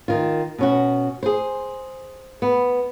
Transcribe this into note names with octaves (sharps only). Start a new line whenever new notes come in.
D#3 F4
B2 C#4 F#4
G#4 C5
B3